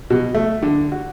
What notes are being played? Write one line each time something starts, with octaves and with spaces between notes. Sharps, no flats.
B2
A3
D3
F#4